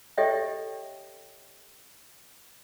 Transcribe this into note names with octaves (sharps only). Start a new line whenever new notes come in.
G4 A4 C#5 D#5 E5 G5